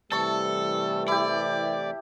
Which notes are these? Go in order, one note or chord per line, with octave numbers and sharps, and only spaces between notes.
C3 E3 G3 A3 A4 A5 C#6
E4 G4 D5